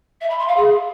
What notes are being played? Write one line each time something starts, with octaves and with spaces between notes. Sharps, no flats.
E5
B5
C6
F5
G#4